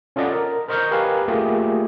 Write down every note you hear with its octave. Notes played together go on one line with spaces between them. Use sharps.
C#4 F4 A4 D5 D#5 F#5
A#4
A#4 C5 D#5 C#6 F6 G6
G4 A#4 B4 F5 G#5
A3 A#3 F4 G4 G#4